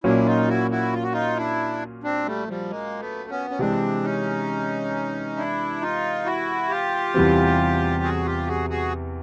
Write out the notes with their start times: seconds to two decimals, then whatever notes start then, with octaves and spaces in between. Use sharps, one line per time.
0.04 A#2 F#3 A#3 C#4 D4 E4
0.26 D#4 F4
0.49 E4 F#4
0.71 E4 F#4
0.93 F4
1.03 F#4
1.13 D#4 F4
1.37 D4 E4
2.04 C4 D4
2.26 G3 A3
2.48 F3 G3
2.70 G#3 A#3
2.99 A3 B3
3.30 B3 C#4
3.50 C#4
3.59 C3 E3 G#3 C4 D4
4.03 C#4 D#4
5.36 D4 E4
5.81 D#4 F4
6.25 E4 F#4
6.69 F4 G4
7.14 E2 C3 E3 G3 C4
8.03 F#4 G#4
8.25 F4 G4
8.47 F#4 G#4
8.70 F#4 G#4